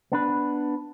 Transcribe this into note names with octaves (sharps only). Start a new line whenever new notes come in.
B3 D4 B4